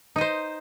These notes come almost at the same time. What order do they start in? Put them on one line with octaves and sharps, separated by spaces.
D#4 D#5 C5